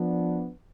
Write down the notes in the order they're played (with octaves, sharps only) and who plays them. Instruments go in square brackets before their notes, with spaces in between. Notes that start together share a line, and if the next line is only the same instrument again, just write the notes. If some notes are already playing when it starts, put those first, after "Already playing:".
Already playing: [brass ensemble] F3 B3 D4